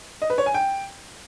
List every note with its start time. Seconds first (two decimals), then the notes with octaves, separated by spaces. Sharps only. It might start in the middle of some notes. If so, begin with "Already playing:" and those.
0.22 D#5
0.30 B4
0.38 C#5
0.46 G#5
0.54 G5